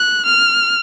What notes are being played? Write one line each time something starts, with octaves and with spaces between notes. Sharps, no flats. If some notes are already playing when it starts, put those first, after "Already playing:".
Already playing: F#6
F6